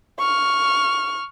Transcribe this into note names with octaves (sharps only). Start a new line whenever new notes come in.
C#6 F6